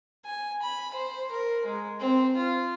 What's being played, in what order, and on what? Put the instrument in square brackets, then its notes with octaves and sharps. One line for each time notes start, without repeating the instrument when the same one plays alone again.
[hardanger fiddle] G#5
B5
C5
A#4
G#3
C4
F4